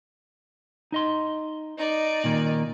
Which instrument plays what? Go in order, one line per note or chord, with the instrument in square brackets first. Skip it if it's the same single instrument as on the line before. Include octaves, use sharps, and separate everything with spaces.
[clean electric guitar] D#4 D#5 C6
[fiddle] D#4 D5
[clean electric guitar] A#2 D#3 A#3